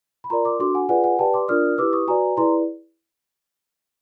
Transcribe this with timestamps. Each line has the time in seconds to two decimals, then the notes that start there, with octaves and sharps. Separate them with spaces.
0.24 B5
0.30 F4 A#4 D5 A#5 C6
0.45 C6 D6
0.59 D4 F#4 A4 C6 D6
0.74 F#5 G#5
0.89 F4 G#4 B4 D5 F#5 G#5
1.04 F#5 G#5
1.19 G4 B4 D5 G5 A5
1.34 C6 D6
1.48 D4 F4 A#4 D5 D#6 F6
1.78 E4 G4 B4 D6 E6
1.93 C#6 D#6
2.07 F#4 B4 D5 G#5 A#5
2.37 E4 G#4 B4 D5 A#5 C6